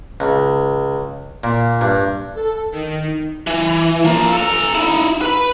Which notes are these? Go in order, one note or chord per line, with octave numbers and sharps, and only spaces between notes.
C#2
A#2
G2
A4
D#3
E3
F3 A#3
A4 A#5
D#4 E4
B4 B5